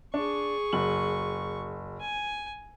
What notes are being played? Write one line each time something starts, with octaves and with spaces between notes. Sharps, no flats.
D4 G#4 C#6
F#1 F#3 F#7
G#5